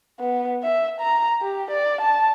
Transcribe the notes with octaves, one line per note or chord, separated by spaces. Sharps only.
B3
E5
A#5
G4
D5
A5